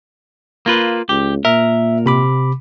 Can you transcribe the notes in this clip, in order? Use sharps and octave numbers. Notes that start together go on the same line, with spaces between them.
A#3 F4 B4
C#2 G4
A#2 A#4 E5
C3 B5 D6